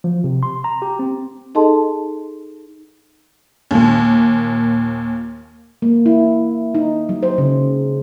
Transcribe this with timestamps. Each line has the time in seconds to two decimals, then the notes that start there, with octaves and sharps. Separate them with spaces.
0.04 F3
0.24 C3
0.43 C6
0.64 A#5
0.82 G4
0.99 C4
1.55 D#4 G#4 A4 D#5 A5 C6
3.71 D#2 A#2
5.82 A#3
6.06 E4
6.75 D#4
7.09 F#3
7.23 C5
7.38 C#3